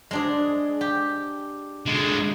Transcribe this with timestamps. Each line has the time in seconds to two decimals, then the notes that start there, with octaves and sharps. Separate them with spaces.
0.11 G#3 D4 G#4
0.81 G4
1.86 D3 G#3